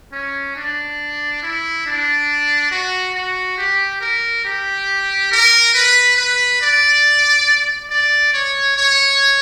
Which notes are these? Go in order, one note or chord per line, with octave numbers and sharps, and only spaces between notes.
C#4
D4
E4
D4
F#4
F#4
G4
A#4
G4
A#4
B4
B4
D5
D5
C#5
C#5